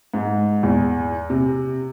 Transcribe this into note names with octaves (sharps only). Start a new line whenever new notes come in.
G#2
E2
C3